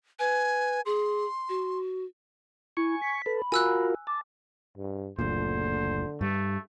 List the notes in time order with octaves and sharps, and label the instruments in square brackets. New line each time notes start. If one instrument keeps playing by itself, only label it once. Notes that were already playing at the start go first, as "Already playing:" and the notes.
[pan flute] B4 [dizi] G#5
[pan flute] G#4 [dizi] C6
[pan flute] F#4
[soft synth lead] E4 [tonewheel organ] G#5 C#6
[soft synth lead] B6
[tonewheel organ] A4 B4
[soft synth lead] B5
[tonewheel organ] F4 F#4 A#4 [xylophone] G#5 E6 F#6
[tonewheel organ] A5 [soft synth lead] D6
[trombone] G2
[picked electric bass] F#1 D2 A#2 [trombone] D3 [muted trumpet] C5
[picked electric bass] G2 G3 [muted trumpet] A3